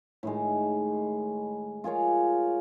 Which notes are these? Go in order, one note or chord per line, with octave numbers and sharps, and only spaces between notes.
A2 D#3 G#3
F4 G#4 A#4 C#5